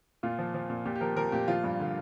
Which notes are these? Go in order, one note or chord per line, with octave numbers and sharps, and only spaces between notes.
A#2 F4
F3
F3
A#2
A#2 G4
G4
F3 A#4
F3 A#4
A#2 G4
F3 F4
G2
D3